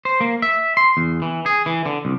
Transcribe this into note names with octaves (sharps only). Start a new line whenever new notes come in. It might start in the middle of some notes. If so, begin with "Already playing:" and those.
C5
A#3
E5
C6
E2
E3
G#4
E3
D3
C2